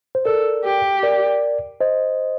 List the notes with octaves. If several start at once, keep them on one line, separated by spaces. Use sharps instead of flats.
C5
A4 A#4 D5
G4
A#4 D5
C5 D#5